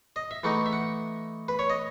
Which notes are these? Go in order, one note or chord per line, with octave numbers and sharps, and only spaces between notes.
D#5
E5
E3 A3 D#4 F#5
E5
F#5
B4
C#5
D#5